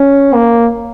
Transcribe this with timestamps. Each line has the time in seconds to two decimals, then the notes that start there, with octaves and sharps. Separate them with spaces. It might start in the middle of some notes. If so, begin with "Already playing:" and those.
Already playing: C#4
0.34 A#3